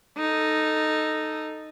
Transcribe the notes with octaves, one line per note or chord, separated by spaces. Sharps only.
D#4 A4